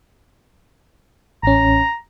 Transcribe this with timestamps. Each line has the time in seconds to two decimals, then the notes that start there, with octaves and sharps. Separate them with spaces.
1.43 A1 C#4 A#5